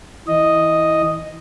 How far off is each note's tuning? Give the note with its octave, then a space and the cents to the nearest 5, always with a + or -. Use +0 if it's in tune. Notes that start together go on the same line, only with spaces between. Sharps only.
E3 -15 D#5 +0